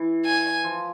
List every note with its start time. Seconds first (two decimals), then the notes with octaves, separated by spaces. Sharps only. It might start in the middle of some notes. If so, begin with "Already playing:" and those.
Already playing: E3
0.25 G#5
0.64 F3